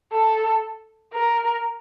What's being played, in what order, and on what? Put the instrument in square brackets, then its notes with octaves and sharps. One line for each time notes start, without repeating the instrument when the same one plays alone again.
[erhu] A4
A#4